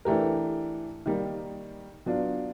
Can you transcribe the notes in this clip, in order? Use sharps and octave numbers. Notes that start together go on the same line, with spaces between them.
E3 A3 D4 G4 A#4
D#3 G3 A#3
F#3 B3 D4 F4